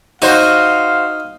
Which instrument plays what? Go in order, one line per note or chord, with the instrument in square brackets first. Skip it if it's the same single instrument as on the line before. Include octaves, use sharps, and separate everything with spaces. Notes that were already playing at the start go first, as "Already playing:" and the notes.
[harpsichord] D#4 [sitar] F#4 C5 [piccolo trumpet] F5